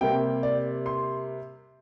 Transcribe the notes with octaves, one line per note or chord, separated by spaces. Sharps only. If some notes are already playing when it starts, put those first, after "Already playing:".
C3 G3 A#3 G5
D5
C6